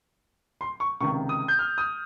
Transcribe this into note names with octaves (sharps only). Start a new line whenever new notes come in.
C6
C#6
C#2 C3 D#3 C#6
D#6
G6
F6
D#6